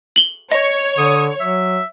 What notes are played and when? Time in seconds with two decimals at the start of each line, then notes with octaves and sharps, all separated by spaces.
0.16 F#7 G7
0.52 C#5 D#5
0.98 D3 D#6
1.40 F#3 E5